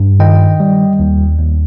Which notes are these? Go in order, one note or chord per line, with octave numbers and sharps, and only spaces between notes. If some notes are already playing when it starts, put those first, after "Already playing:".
Already playing: G2
D#3 D#5 G5
G3
D#2
D#2